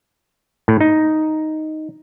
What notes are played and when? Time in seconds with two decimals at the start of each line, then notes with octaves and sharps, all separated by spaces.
0.68 A2
0.81 D#4